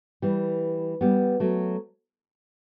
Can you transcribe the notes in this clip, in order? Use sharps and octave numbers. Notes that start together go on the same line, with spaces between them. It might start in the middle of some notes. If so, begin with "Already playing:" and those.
E3 G3
G3 B3
F#3 A3